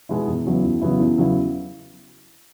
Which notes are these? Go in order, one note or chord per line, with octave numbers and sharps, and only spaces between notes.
B2 G#3 B3 E4
E2
C#3 F#3 B3 E4
E2
C#3 F#3 B3 E4
E2
C#3 F#3 B3 E4